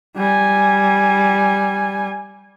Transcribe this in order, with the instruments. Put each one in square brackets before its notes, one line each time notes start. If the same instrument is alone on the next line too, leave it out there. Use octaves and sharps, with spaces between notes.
[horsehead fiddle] G3 G#5